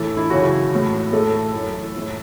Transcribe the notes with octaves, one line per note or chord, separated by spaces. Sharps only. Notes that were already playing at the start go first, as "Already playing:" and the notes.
Already playing: A2 E3 A3 A4
E4
F#2 C#3 E3 F#4
A2 E3
A2 E3 A3 A4
F#2 E3
A2 E3